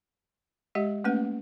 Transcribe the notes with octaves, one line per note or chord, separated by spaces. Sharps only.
G#3 G4 D#5 F#5
A3 A#3 C#4 B4 F#5